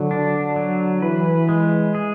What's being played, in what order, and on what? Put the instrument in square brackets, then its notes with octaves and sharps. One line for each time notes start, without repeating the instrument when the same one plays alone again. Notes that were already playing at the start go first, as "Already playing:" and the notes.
Already playing: [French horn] D3 [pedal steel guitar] F#3
[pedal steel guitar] D4
F#3
[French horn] E3 [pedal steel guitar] B4
[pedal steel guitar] G#3
G#4